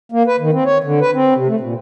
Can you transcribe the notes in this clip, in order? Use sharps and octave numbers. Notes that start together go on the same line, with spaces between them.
A#3
B4
D#3
C4
C#5
D3
B4
C4
C3
A3
A#2